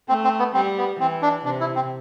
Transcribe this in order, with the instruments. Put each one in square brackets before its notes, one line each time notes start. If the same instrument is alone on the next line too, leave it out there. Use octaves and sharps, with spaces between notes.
[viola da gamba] A3 [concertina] C4
[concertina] C4
B3
[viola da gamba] G3 [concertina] C4
[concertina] B3
[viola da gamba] E3 [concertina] C4
[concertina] D4
[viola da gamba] C3 [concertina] D4
[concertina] E4
C4